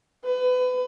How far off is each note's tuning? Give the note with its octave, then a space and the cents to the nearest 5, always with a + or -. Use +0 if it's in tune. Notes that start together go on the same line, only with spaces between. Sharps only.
B4 +30